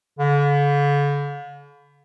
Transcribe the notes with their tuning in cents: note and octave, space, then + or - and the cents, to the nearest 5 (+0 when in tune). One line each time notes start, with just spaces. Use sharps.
D3 -45